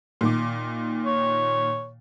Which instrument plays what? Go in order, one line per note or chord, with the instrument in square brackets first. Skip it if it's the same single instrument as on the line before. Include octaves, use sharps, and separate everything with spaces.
[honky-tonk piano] A#2 D#3 D6
[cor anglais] C#5